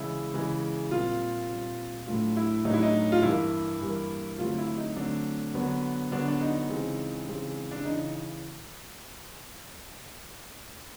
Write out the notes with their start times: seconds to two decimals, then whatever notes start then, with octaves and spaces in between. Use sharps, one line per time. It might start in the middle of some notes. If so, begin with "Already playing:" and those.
Already playing: C#3 E3 G#3 E4
0.34 C#3 E3 G#3
0.91 A#2 G3 C4 F4
1.50 A#2 G3 C4
2.07 A2 F#3 A3 D4 F4
2.37 E4
2.65 A2 F#3 A3 D4 D#4
2.74 E4
2.83 D#4
3.12 F4
3.22 G2 E3 G3 A#3 E4
3.81 G2 E3 G3 A#3
4.38 D3 F#3 A3 C4 F4
4.58 E4
4.77 D#4
4.96 D3 F#3 A3 C4 D4
5.54 D3 F#3 B3 D4
6.11 D3 F#3 B3 D4
6.28 D4
6.41 D#4
6.69 C#3 E3 G#3 C4
7.27 C#3 E3 G#3 C4
7.72 D4
7.85 C#3 E3 D#4